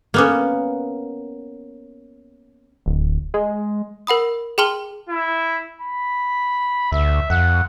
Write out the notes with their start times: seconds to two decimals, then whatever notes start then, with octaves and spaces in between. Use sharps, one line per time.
0.14 A#3 B3 C#4
2.86 D1
3.34 G#3
4.07 A#4 F#5 B5 D#6
4.58 G#4 G5 A5 C6 F6 G7
5.09 E4
5.81 B5
6.92 D2 E5
7.30 F2 F#5